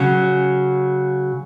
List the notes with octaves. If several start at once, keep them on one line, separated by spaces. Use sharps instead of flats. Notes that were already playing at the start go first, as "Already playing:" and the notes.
Already playing: C#3 F#3 C#4